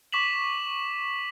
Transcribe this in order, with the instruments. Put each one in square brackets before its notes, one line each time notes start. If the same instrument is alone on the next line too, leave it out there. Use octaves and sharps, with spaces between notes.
[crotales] C#6 D6 B6 E7 F#7